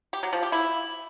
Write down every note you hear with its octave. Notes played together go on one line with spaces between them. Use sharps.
G4
F#3
F3
G4
E4